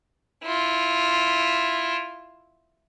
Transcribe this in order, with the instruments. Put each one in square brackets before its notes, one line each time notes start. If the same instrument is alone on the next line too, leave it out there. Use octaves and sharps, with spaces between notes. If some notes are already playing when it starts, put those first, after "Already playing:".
[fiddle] E4 F4